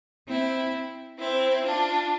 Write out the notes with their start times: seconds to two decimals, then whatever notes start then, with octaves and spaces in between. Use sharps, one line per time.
0.28 C4 E4
1.18 C4 E4
1.64 D4 F4